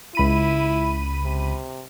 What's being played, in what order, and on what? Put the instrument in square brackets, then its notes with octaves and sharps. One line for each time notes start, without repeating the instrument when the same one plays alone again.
[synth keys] C#2 B5 D#7 [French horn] E4
[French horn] C3